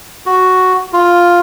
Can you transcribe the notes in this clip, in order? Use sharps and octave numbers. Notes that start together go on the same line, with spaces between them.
F#4
F4